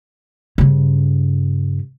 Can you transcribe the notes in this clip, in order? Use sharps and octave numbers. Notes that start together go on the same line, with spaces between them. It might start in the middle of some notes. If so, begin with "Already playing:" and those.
G2 C#3